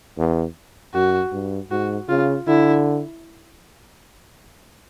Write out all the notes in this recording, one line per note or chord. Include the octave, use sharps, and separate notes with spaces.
E2
F#2 F#4
G2
G#2 F#4
C#3 F4
D3 E4